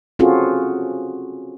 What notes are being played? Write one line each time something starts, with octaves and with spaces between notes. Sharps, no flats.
C4 C#4 F4 F#4 G#4 A4